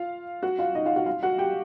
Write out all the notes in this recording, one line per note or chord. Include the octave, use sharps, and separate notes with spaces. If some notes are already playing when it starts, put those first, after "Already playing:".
Already playing: F4 F5
F#4 F#5
F4 F5
D#4 D#5
F4 F5
F#4 F#5
F4 F5
F#4 F#5
G4 G5